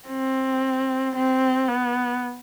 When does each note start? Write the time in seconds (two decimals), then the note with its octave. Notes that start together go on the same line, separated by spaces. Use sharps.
0.09 C4
1.16 C4
1.68 B3